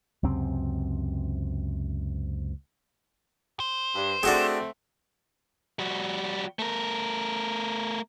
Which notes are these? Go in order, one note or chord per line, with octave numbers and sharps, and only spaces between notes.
C#2 F#2 C3 C4
C5
G2
A3 C4 D4 F#4 G#4
G3 F#4
A3 A#4